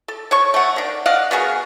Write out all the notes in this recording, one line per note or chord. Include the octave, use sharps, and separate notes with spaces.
A4
C#5 A5 C#6
A3 F#5
D#3 D4
D5 D#5 F5 F#5
B3 F#4 G#4 A#4